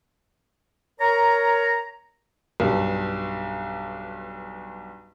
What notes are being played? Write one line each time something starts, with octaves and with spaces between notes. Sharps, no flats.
A#4 C#5 A#5
B1 G2